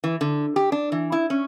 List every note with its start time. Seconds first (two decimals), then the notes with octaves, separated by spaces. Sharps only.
0.04 E3
0.21 D3
0.56 G4
0.72 D4
0.92 E3
1.12 E4
1.30 C#4